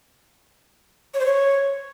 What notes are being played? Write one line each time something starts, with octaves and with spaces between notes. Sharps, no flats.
C#5
C5
C#5